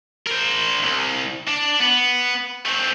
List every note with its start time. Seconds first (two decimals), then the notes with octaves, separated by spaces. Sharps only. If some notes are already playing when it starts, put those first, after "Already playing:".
0.27 A#4 C5
0.84 C2
1.48 D4
1.80 B3
2.66 A3 C4